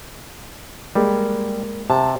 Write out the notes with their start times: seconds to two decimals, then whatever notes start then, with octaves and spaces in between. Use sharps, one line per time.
0.95 G3 G#3 A#3
1.90 C3 A5